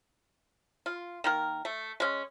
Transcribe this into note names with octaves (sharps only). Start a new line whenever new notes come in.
F4
D#3 A#3 A#4
A3
G#3 C#4